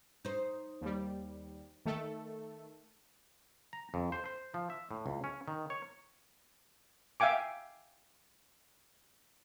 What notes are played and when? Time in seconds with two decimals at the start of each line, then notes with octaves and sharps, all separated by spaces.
0.25 D#4 C5
0.81 D#2 G3
1.85 D#3 A3 A4
3.73 A#5
3.94 F2
4.12 C5
4.26 C5
4.54 F3
4.70 E5
4.91 A2
5.06 C#2
5.24 C#4
5.48 D#3
5.70 C#5
7.20 E5 F5 G5 G#5 D6